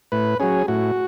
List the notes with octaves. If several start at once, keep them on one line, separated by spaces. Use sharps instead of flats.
A2 B4
F#3 C#4 G#4
A2 F#4